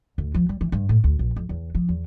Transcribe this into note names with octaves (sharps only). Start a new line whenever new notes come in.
D2
F3
G3
E3
G2
A2
D2
A#1
F2
E2
F3
E2